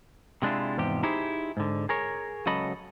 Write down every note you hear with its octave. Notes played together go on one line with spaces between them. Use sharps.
C3 G#3 D4 E4 F4
E2 G#2 C3 F3 G4
D#4 E4 G4 G#4 C5
G#2 D3
G#4 A#4 C#5
C#2 C#3 F#3 A4 D#5 B5